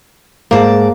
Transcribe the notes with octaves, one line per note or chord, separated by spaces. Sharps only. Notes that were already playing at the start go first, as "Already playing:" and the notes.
G#2 A#3 D5 A5